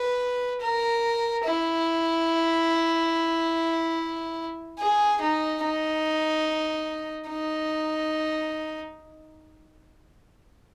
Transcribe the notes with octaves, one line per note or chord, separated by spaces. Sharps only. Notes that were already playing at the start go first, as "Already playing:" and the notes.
Already playing: B4
A#4
E4
G#4
D#4
D#4
D#4